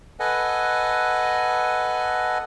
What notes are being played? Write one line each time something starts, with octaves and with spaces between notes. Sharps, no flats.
A4 B4 D#5 F#5 G#5